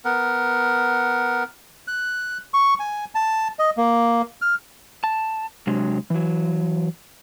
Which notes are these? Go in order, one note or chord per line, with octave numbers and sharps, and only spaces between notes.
B3 A#4 F#5
F#6
C#6
G#5
A5
D#5
A#3
F6
A5
C3 F#3 G#3 D4
E3 F#3